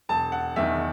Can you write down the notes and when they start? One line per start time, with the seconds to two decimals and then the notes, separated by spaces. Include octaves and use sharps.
0.09 E1 A5
0.32 F#5
0.56 E2 D#3 E5